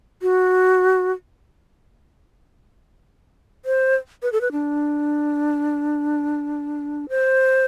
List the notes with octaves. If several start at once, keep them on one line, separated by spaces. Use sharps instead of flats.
F#4
C5
B4
A4
B4
D4
C5